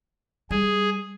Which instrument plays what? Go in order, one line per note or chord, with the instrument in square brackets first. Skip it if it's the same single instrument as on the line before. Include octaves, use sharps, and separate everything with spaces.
[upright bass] G3 [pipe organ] G#4